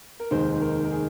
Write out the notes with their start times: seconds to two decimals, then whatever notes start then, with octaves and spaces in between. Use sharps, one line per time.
0.20 A#4
0.31 F1 D#2 D#3 G#3 C5
0.61 A#4
0.84 A#4
0.91 G#4